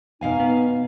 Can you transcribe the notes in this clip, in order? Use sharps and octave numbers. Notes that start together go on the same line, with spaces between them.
B2 D#4 F5 G#5
B3